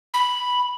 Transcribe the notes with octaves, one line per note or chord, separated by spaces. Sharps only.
B5